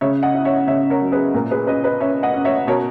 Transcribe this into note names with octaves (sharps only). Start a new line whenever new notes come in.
C#3 C#5 E5
D#5 F#5
E4
C#5 E5
C#3 C#5 E5
A#4 C#5
F#3
G#4 B4
A#2 A#4
G#4 B4
C#4 B4 D#5
B4 D#5
C#4 C#5 E5
D#5 F#5
C#4
C#5 E5
B2 A#4 C#5